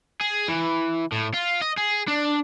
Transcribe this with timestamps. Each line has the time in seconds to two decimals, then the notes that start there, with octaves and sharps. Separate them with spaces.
0.21 G#4
0.48 E3
1.12 A2
1.34 F4
1.62 D#5
1.77 G#4
2.08 D4